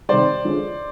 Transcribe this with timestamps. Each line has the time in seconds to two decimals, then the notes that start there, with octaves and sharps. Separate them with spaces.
0.09 C3 D#3 G3 C5 D5
0.45 D3 F3 G#3 C#4